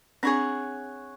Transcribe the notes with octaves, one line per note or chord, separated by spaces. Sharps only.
C4 D4 G#4 C#5 F#5